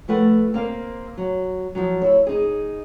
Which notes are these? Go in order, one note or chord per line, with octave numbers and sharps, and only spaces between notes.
F3 A3 B4 F#5
A#3 C4 F5
F#3
F3 F#3
E4 C#5
D#4 G#4